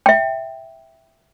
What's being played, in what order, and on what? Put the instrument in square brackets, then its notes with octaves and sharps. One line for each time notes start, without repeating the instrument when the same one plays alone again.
[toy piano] E5 G5